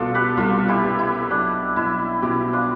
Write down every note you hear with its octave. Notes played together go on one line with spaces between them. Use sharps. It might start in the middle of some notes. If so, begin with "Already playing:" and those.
Already playing: C2 B2 D4 F4 A4
G4 B4
C2 F4 A4
E4 G4
B3
E4
B1 D4
B1 E4
B2 E4 G4
D4 F4